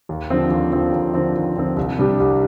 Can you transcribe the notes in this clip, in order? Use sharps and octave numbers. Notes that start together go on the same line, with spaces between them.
D#2
D3 F3 C4
D#2
D3 F3 C4
D#2
D3 F3 C4
D#2
D3 F3 C4
C2
C3 G3 D4 G4
C2